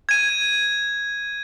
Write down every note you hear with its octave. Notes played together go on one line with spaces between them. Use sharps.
G#6 D#7